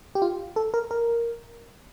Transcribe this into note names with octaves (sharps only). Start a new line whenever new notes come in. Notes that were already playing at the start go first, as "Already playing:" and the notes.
G4
F4
A4
A#4
A#4